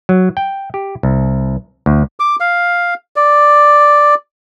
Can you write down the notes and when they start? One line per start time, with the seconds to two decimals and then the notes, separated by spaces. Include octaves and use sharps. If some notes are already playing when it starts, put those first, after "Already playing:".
0.09 F#3
0.37 G5
0.74 G4
1.03 C2
1.86 D2
2.20 D6
2.40 F5
3.16 D5